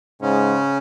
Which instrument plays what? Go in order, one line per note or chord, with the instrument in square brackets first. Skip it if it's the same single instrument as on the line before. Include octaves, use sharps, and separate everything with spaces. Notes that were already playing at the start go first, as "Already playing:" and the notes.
[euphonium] G#2 [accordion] C#3 C#4